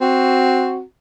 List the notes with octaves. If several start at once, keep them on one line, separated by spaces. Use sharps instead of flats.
C4 F#4